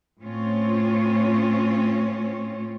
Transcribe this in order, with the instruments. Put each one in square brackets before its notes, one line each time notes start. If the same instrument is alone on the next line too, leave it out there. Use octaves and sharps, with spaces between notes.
[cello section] A2 C4 C#4 F4 C#5